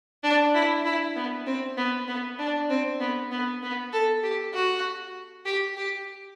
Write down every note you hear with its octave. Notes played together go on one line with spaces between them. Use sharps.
D4
E4
E4
B3
C4
B3
B3
D4
C4
B3
B3
B3
A4
G4
F#4
G4
G4